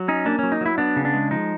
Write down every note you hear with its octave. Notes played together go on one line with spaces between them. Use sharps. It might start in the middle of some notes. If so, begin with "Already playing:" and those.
Already playing: F#3
C#4 D#4
A#3 D4
F#3 C#4
D#4
F#3 E4
B3 D4
C#3
D4
G#3
F3 D#4